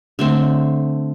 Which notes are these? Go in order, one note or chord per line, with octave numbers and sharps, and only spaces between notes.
D3 A3 C4